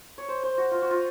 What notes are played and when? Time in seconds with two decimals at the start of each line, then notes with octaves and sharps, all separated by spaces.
0.18 C#5
0.28 C5
0.43 C5
0.58 F#4
0.71 F4
0.82 F#4
0.91 F4